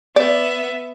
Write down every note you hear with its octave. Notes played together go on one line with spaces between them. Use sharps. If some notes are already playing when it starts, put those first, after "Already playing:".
B3 D5 E5